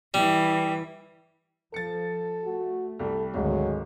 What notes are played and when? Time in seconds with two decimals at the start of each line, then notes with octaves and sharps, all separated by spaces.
0.14 E3 G3
1.74 F3 A4 A6 C#7
2.44 A3 F#4
2.99 C2 G3 A4
3.34 G#1 D2 D#3 F#3 G#3